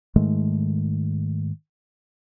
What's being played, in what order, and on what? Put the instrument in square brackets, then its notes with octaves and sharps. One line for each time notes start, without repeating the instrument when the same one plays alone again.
[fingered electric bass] G#2 D#3 G#3 A3